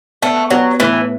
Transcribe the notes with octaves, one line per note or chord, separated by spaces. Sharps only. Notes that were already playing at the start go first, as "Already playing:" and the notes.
A3 B3
F#3 B3
A2 E3